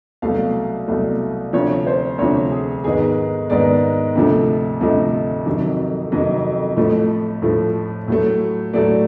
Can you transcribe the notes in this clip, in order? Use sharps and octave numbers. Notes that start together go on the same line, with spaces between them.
C2 B2 F#3 A3 F5
C2 B2 F#3 A3
D2 C3 F3 C#5
C5
D2 C3 F3 C#5
G#4
G#2 D#3 G#3 B3 G#4
G#2 D#3 G#3 B3 D5
D2 C3 F3 A3
D2 C3 F3 A3 D#5
F2 C3 D#3 F#3
F2 C3 D#3 F#3 D#5
A2 F3 A3
A2 F3 A3
A2 F#3 A3
A2 F#3 A3 D5